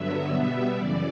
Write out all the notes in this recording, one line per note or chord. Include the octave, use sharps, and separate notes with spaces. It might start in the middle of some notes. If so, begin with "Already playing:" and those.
Already playing: G2 D3 F#3 B3 E5
B2 G3 B3
F#2 C#3 E3 D5